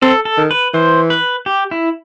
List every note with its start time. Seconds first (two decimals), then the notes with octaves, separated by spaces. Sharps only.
0.02 C4 A4
0.25 A4
0.38 D#3
0.51 B4
0.74 E3 C5
1.10 B4
1.46 G4
1.71 E4